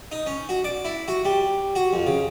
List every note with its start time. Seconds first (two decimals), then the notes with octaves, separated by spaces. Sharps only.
0.12 D#4
0.26 C#4
0.49 F#4
0.64 D5
0.85 E4
1.08 F#4
1.25 G3
1.75 F#4
1.93 F2
2.07 C#3